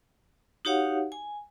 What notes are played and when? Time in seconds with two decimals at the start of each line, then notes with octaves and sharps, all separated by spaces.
0.65 D#4 F#4 G4 C#5 F5 F#5
1.12 G#5